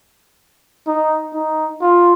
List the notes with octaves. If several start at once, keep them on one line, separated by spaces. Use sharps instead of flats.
D#4
D#4
F4